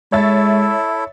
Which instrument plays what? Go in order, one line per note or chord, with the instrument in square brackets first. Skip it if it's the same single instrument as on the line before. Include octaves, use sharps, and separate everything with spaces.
[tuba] G#3 [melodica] E4 A4 [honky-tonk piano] C#5 E5 A6